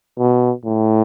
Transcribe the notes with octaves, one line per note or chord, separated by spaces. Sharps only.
B2
A2